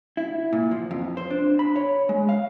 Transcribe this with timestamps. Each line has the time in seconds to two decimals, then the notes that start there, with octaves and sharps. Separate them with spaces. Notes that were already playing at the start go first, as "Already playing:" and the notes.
0.17 E4
0.53 A#2
0.71 F3
0.91 F2
1.17 C5
1.30 D4
1.59 B5
1.76 C#5
2.09 G#3
2.29 F5